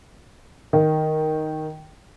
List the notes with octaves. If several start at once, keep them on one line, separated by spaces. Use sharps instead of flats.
D#3